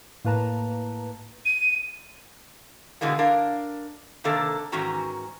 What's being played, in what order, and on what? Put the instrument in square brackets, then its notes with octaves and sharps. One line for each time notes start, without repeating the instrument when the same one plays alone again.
[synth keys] A2 A#3 B4 A5 A#5
[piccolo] D#7
[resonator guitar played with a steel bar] B2 D3 E3 G#3 A#3
D4 A#4 F5
C3 D#3 A#3 D4 A4
G#2 D#3 E3 C#4 F#4 A#5